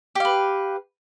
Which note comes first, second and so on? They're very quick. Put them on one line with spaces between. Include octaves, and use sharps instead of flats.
G4 F5 B4